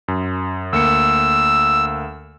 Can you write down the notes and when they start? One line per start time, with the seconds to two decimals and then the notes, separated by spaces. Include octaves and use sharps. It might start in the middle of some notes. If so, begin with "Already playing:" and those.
0.08 F#2
0.73 D2 A#3 E6 C#7